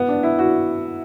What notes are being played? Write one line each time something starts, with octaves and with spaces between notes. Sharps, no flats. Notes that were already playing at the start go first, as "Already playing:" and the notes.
Already playing: B3
D4
E4
F#4